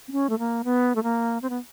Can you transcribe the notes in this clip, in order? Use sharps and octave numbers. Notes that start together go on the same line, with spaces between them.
C4
C#4
A3
A#3
B3
A3
A#3
C4
B3